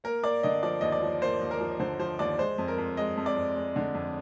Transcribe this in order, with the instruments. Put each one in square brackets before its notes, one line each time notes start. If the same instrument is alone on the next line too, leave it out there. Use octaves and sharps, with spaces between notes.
[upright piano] A#3 A#4
A#3 D5
D3 D#5
F3 D5
D#2 D#5
D5
F3
A#3 C5
D#2
A#4
F3
D3 C5
F3 C5
D#2 D5
G#3 C5
F2
A#4
F2
G#3 D#5
F2
D5
F2
G#3
D3
F2